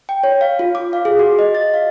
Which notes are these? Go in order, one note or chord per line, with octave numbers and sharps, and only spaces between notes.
G5
C#5
F5
F4
D6
F5
G#4
F#4
D#5
A6
F5